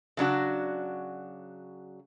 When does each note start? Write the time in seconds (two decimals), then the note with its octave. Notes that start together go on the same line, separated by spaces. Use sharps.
0.17 C#3 F#3 D4 F#4